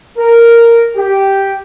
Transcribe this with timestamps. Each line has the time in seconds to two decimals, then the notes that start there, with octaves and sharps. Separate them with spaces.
0.17 A#4
0.96 G4